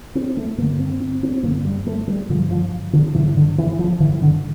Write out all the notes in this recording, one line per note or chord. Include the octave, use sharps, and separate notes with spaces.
C4
A3
G2 D3 A#3
C4
C4
C4
G2 D3 A#3
G3
A3
G3
G2 D3 F3
F3
D3
G2 D3 E3
D3
E3
F3
G2 D3 E3
D3